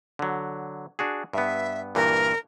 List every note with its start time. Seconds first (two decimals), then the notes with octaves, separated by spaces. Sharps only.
0.19 D3 F#3
0.99 D4 F#4 G#4
1.33 G2 B3 E5
1.95 G2 A#2 E3 A#4